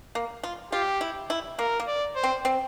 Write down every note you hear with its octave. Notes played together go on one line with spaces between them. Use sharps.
A#3
F4
F4 G4
E4
E4
A#3 A#4
A#3
D5
C5
C4
C4